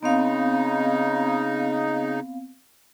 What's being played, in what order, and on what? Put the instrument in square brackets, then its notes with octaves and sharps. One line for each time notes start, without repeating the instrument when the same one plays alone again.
[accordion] C#3 D#4 [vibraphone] B3 C4 F5